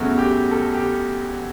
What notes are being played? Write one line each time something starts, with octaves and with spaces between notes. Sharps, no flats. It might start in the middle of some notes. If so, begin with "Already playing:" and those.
Already playing: E2 C#3 F#3 A3 F#4
G4
A4
G4